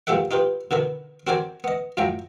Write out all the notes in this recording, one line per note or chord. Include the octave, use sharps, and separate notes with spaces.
G2 A#2 G4 A4 E5 F#5
D#4 F4 G4 B4
B2 D3 D#3 B4
C4 F#4 A#4 C5 D5 G#5
B3 D#5
F#2 A2 F3 F#3 G5 A#5